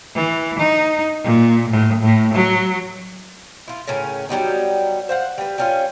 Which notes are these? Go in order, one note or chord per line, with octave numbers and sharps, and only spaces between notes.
E3
D#4
A#2
A2
A2
F#3
E4 F4
A2 C#3 C#4 A#4
F#3 G3 B3 D#4
C5 F5 F#5
G3 B4
G3 C#4 F4